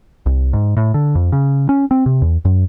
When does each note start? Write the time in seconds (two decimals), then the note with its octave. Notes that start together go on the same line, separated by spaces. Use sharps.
0.26 C2
0.53 G#2
0.77 A2
0.94 D3
1.15 F2
1.32 C#3
1.69 C#4
1.91 C4
2.06 C3
2.22 E2
2.45 F#2